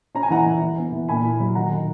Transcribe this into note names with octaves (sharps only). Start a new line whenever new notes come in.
C#4 A#5
G#5
E3 F#5 A#5
E3
E3
B3
E3
A#2 G#5 B5
E4
F#3
D#3 F#5 A#5
D#3